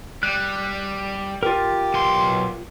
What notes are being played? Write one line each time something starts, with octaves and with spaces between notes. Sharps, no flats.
G3 F#6
F4 G4 A#4
B1 C6